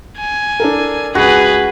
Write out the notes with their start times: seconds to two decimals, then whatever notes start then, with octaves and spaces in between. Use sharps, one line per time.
0.19 G#5
0.60 D4 A4 A#4
1.15 C#2 F#4 G#4 B4